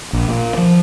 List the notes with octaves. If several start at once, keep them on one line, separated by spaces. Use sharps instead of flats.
A#1
A#2
F3